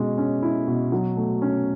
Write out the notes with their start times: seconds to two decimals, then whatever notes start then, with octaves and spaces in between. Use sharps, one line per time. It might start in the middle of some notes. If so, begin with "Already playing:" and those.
Already playing: B2 G#3 C#4
0.18 C#4
0.43 E4
0.67 B2
0.92 F#3
1.16 A3
1.42 C#4